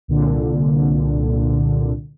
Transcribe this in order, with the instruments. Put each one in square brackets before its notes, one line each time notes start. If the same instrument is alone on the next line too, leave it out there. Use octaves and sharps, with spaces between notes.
[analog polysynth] C2 A#2 D3